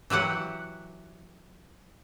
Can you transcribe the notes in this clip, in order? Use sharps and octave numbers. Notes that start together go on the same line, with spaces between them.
E3 F#3 G4 F#5